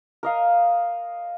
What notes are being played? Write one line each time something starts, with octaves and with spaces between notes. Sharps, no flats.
A#4 D#5 F5